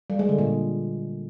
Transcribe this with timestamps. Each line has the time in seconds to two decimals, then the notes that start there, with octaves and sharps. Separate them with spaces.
0.10 G3
0.19 G#3
0.29 D3
0.39 A#2